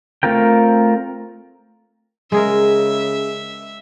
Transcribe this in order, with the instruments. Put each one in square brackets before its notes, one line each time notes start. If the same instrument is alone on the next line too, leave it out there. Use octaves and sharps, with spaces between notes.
[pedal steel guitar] A3 C4 F4 A#4 G5
[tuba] C#3 [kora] G#3 G#4 A#4 [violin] E5